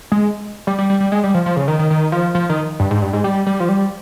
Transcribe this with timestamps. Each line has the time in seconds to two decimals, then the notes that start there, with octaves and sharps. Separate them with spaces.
0.12 G#3
0.67 G3
0.79 G3
0.90 G3
1.00 G3
1.12 G#3
1.24 G3
1.34 F3
1.46 F3
1.57 C#3
1.68 D#3
1.79 D#3
1.90 D#3
2.12 F3
2.35 F3
2.49 D#3
2.80 G2
2.91 G#2
3.02 G2
3.13 G#2
3.24 G3
3.47 G3
3.60 F3
3.69 G3